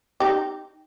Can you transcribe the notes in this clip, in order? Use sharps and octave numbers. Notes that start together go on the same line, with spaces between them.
D#4 G4